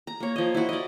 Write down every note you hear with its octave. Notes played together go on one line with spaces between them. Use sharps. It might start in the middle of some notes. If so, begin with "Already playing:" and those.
A#5
A#3 C#5
F3 D#5
E4 F#4
D5 D#5